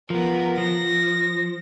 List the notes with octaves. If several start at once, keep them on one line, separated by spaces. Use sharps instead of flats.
F3 B3 A#4 B4
F3 A#6